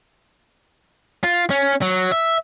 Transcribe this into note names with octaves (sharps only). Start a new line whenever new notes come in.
F4
C#4
F#3
E5